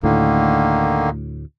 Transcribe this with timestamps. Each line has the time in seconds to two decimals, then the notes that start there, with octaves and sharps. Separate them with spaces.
0.03 D2 A2 D3 D#3 A#3